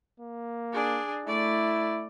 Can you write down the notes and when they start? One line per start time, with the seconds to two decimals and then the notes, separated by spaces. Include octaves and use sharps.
0.20 A#3
0.72 D4 G#4
1.26 A3 E4 D5